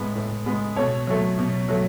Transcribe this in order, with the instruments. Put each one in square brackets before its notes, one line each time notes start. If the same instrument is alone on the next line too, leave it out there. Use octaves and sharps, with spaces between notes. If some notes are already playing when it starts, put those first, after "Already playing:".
Already playing: [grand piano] A2 G#3 B3 B4
A2
G#3 B3
B2 A4 C#5
F#3 A3
B2
F#3 A3